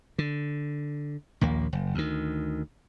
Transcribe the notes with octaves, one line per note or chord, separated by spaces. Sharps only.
D3
A#1 D#2 A#3
F#1
D2 D#3